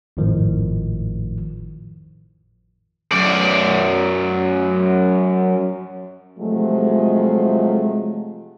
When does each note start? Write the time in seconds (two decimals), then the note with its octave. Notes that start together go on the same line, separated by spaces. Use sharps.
0.17 G#1 F2 A2 D#3 F3
3.12 F#2 D5
6.39 C3 F3 F#3 G#3 A3